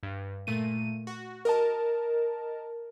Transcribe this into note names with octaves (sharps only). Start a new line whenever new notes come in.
G2
A#2 A3 D#7
F#4
A#4 D#5 A5